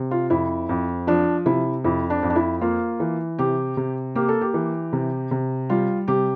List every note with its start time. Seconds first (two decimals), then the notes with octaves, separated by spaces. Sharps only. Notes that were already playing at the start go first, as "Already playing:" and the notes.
Already playing: C3
0.11 F4
0.30 F2 E4
0.69 F2
1.07 F3 D4
1.46 C3 E4
1.84 F2 E4
2.10 D4
2.23 F2
2.30 D4
2.36 E4
2.61 A#3 F4
3.00 E3
3.39 C3 G4
3.77 C3
4.15 A#3 G4
4.28 A4
4.41 G4
4.54 E3
4.93 C3
5.31 C3
5.70 G3 F4
6.08 C3 G4